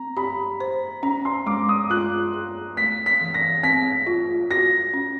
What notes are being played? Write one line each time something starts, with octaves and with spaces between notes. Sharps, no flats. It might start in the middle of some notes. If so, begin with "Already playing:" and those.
Already playing: C4 A#5
G4 B5
C5
C#4 A#5
C6
G#3 D6
D#6
F4 F#6
G#4
A3 B6
B6
E3
A#6
C4 B6
F4
F#4 A#6
C#4